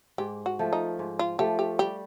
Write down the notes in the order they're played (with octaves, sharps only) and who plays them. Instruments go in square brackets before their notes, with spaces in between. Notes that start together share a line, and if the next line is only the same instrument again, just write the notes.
[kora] G#2 [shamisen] G4
[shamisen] F#4
[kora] F3 A3
[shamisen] D#4
[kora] G#2
[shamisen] F4
[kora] F3 A3 [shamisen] G4
[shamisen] G4
[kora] G3 [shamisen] G4